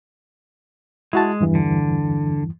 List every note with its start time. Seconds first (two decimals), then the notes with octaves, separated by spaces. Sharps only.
1.13 G#3 E4 F#4 A5
1.41 E2 G2 E3
1.55 D3